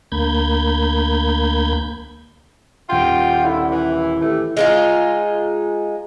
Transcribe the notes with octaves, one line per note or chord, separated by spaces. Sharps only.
D2 A#3 B5 G6 G#6
D#1 F4 F#5 G5 C6
D3 E4
E3
E3 A3 G4
G#3 D#4 F4